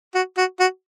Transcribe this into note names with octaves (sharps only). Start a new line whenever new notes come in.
F#4
F#4
F#4